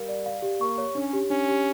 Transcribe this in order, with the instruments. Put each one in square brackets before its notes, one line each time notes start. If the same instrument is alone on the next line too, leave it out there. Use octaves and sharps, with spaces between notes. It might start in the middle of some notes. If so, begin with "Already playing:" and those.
Already playing: [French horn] G3 [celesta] A#4 F5
[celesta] D5
F5
G4
[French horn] A#3 [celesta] C#6
[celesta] C#5
[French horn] C#4 [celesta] D4
[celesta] G4
[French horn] C#4 [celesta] D4
[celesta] G4